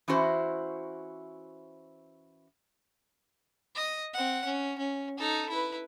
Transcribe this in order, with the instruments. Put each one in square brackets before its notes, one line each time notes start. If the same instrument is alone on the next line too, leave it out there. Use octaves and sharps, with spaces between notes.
[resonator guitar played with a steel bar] E3 C#4 E4 F#4 C5
[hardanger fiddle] D#5
C4 F#5
C#4
C#4
D#4 A4
E4 B4